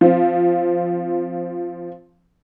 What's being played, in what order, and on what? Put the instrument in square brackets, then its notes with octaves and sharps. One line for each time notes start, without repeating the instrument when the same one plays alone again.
[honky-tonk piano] F3 C4